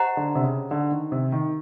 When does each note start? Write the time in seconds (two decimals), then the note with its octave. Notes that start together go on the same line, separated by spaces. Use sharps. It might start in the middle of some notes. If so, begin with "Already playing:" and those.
Already playing: G4 C5 D#5 F#5 A#5
0.17 D3
0.35 C3
0.44 C#3
0.71 D3
0.91 D#3
1.12 C3
1.32 D#3